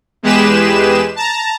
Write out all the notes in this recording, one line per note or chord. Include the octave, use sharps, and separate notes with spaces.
E2 G#3 G4 G#4 B4 E7
A5 A#5